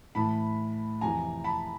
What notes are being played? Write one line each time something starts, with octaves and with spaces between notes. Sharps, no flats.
A2 E3 A5 B5
F2 C3 E3 G#5 A#5
A5 B5